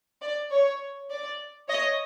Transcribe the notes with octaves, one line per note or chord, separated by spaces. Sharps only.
D5
C#5
D5
C#5 D#5